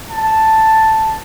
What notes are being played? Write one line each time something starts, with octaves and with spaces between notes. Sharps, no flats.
A5